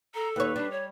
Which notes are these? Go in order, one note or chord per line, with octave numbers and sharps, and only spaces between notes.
A4 A#5
D#2 B4 C#5
G3 D4
C#5